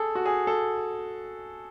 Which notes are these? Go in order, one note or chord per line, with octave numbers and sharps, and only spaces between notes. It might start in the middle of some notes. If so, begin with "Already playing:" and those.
Already playing: G#4 A4
F#4
G#4
A4